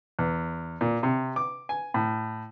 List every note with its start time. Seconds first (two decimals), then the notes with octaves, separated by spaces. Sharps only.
0.19 E2
0.81 A#2
1.03 C3
1.36 D6
1.69 G#5
1.94 A2